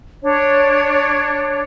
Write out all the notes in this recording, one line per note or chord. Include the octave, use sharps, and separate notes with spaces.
D4 C#5